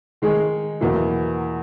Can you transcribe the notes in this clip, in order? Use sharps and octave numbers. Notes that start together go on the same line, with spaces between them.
D#3 G#3 D#4 G#4
E2 B2 F#3 A#3 E4